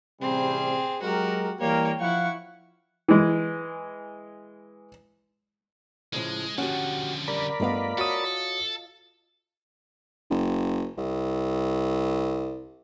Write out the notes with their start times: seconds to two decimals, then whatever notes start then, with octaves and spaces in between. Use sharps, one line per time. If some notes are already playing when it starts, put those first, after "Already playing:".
0.22 A1 C3 G3 C4 G#4
1.02 F#3 G#3 F#4 G4 A#4
1.61 E3 G3 A#3 C#5 G5
2.00 F3 E4 F5 F#5 C#6
3.08 E3 G#3
6.13 A2 C#3 F3 G#3
6.58 D3 F3 C#4 F#4 G4 F#5
7.28 G3 A#4 D5 B5
7.60 G2 A3 B3 F4 D#5 F5
7.98 F#4 A4 C#5 D#6
10.30 F#1
10.98 C2